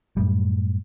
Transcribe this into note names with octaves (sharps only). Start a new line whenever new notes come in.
F#2 A2 G3